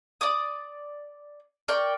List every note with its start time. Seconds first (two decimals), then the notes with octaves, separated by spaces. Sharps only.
0.21 D5 D6 D#6
1.68 A#4 D5 G5 C#6